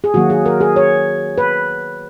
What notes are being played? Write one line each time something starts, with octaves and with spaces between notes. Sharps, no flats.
G#4
D#3 F#3 A#3 F#4
G#4
A#4
G#4
C#5
B4